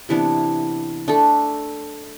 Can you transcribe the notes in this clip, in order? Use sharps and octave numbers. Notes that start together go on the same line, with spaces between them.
C3 E3 B3 D4
A3 D4 A4